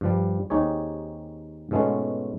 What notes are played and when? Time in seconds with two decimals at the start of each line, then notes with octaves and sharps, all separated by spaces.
0.01 G2 F3 G3
0.50 D#2 C4 D#4 G4 G#4 C#5
1.71 G#2 B2 G#3 A3 B3 C#4